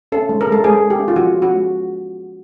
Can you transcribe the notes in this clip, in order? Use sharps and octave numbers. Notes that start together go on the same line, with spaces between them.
C#4 A4
G#3
A#4
G#3
A4
G#3 G#4
G#3
G4
C#4
F4
F3 F#4
C#4
F#4
G#3